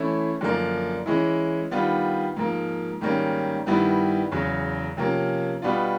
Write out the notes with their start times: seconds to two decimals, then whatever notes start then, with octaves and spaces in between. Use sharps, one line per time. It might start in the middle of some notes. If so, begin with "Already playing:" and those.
Already playing: E3 A3 C#4 E4
0.41 F#2 D3 F3 A#3 D4
1.06 E3 G#3 C#4 E4
1.71 D#3 G3 B3 D4 F4
2.37 G#2 F3 A#3
3.01 G#2 D#3 G3 A#3 C#4
3.66 G2 D#3 G3 B3 E4
4.31 E2 C#3 F#3
4.97 C3 F3 A#3 C#4
5.62 B2 G3 B3 D4 F4